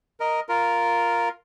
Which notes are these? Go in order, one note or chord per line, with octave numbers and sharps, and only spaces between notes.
A#4 D#5
F4 A#4